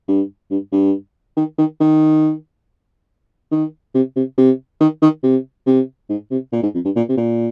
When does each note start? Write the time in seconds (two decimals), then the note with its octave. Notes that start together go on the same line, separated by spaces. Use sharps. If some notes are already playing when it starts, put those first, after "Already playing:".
0.08 G2
0.51 G2
0.72 G2
1.37 D#3
1.58 D#3
1.80 D#3
3.51 D#3
3.95 C3
4.16 C3
4.38 C3
4.81 D#3
5.02 D#3
5.23 C3
5.67 C3
6.10 G#2
6.31 C3
6.53 A#2
6.63 G#2
6.74 F2
6.85 G2
6.96 A#2
7.09 C3
7.17 A#2